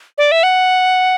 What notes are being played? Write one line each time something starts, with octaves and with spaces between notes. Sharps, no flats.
D5
E5
F#5